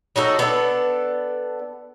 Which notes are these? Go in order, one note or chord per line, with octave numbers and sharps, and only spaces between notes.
F#3 D#4 F#4 A4
B3 D4 A4